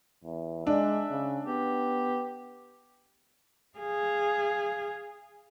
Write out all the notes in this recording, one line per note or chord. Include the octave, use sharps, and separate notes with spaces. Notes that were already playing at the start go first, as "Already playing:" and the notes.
E2
G#3 D4 E5
C#3
B3 G4
G#4 F5